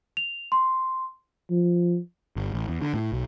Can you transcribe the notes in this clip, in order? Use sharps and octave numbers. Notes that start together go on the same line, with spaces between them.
F7
C6
F3
G1
A1
E2
D3
A2
B1